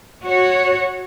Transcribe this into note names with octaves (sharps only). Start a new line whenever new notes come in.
F#4 C#5